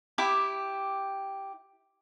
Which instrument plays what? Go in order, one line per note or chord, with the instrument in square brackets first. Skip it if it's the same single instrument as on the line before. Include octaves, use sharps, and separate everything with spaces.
[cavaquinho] E4 G4 D6